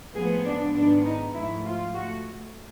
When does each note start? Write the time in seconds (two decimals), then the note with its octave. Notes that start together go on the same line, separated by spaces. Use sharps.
0.15 A2 F3 G#3 B3 G#4
0.45 D4
0.74 G#2 D#3 G#3 B3 D4
1.05 D#4
1.35 G#2 F3 A3 E4
1.64 F4
1.94 A3 F#4